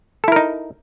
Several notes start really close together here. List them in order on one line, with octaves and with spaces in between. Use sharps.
A4 E4 A#4 D#4